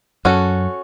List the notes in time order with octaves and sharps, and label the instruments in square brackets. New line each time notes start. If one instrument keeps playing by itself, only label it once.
[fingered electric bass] F#2 [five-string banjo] C#4 F#4 A4